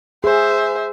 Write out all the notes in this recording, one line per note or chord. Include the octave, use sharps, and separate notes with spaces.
G#4 C5 E5